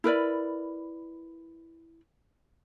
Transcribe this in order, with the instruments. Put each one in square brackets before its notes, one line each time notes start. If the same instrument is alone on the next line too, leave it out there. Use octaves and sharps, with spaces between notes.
[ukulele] E4 A#4 B4 D5